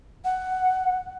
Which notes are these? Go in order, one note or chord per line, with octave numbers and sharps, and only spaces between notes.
F#5